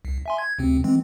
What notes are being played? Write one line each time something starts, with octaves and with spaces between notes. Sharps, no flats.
C2
E5 G#5 C6
G#6
D2 C3 C4
E3 G#3 C4